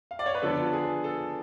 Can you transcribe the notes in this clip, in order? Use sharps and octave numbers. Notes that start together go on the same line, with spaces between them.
F5
D5
C#5
B4
D3 F3 B3 D4 A4
G#4
A4